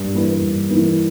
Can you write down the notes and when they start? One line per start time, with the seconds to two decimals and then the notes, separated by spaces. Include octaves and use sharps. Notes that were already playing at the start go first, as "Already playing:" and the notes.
Already playing: G2
0.13 E3 A#3 E4 B4
0.41 G2
0.70 E3 A#3 E4 B4